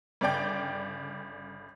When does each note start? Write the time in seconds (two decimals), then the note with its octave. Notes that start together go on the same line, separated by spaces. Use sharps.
0.21 G1 C#3 D5 G5